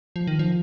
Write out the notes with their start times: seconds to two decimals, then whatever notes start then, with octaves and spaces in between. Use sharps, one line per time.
0.16 F3
0.27 D#3
0.39 F3